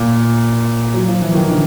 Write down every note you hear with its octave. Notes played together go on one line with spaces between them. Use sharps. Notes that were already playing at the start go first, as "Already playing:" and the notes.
Already playing: A#2
F#3
F3
E3
D#3
D3